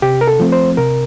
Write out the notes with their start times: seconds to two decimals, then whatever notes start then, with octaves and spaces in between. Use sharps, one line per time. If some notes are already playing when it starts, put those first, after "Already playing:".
0.02 C3 G4
0.21 A#4
0.27 A4
0.40 F3 A3 C4
0.52 C5
0.77 C3 A#4